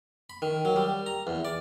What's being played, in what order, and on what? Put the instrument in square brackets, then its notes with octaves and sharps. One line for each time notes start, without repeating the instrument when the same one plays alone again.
[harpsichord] B5
D#3
F#3
G3
A#5
E2
D5